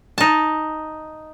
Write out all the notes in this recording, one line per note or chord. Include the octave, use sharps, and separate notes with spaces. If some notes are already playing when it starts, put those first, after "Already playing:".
D#4 A5